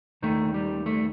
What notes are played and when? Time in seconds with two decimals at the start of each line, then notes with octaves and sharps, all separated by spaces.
0.23 D#2 D#3 A3
0.54 G3
0.86 A3